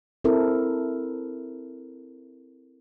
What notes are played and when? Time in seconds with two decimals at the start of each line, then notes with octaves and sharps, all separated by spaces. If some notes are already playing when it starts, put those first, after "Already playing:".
0.24 C4 E4 A4 A#4